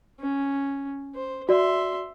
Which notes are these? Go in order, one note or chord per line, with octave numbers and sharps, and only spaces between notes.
C#4
C5
F#4 D5 E5 C6